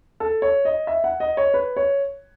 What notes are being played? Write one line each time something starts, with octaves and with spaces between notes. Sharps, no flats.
A4
C#5
D#5
E5
F#5
D#5
C#5
B4
C#5